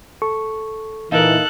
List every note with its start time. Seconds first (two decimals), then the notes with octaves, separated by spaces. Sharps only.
0.22 A4 C#6
1.12 A#2 E3 D#4 A4 A#4 F5 F#6